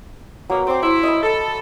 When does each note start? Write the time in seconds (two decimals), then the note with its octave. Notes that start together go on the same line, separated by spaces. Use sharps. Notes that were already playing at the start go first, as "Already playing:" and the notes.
0.50 B2 F#3 A#3
0.67 C4 C5 D6
0.82 E4 C5 C#6
1.03 D#5 E5 B5
1.23 A4